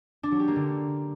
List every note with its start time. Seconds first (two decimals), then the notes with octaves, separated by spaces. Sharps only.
0.23 D4
0.32 F#3
0.40 G4
0.48 A#3
0.56 D3